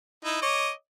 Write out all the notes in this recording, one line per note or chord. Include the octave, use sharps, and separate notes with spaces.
D#4 E4
C#5 D#5 D6